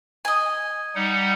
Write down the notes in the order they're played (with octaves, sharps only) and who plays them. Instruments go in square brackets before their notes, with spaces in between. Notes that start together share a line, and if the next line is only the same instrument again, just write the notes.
[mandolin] D#5 G#5
[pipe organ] G3 D#4 F#5